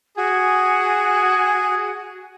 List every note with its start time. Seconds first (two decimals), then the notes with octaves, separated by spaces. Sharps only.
0.17 F#4 G#4 G#5